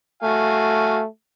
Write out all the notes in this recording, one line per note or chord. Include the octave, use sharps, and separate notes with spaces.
A3 F#4 F5 G#5